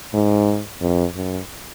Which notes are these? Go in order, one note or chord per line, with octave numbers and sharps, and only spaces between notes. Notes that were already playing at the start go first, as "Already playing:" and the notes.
G#2
F2
F#2